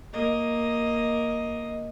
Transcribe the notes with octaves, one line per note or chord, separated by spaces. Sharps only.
A#3 D#5